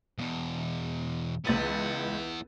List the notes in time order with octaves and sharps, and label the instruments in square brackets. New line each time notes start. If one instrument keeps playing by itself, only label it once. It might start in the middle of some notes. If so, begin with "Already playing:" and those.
[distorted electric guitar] E2 B2
[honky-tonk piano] C#2 A6 D#7 [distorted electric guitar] B3 E4